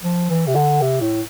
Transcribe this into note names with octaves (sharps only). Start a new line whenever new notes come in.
F3
E3
C3
D3
C3
A2